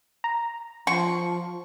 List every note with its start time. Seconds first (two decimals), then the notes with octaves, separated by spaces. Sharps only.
0.24 A#5
0.87 F3 C6 C#6